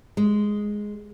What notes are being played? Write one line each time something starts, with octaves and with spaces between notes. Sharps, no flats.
G#3